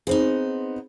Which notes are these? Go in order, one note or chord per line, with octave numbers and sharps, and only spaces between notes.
B3 C4 D#4 G#4 C5